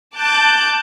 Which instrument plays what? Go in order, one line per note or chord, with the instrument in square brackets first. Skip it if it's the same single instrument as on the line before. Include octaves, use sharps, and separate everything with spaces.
[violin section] A5 D6 F#6 G6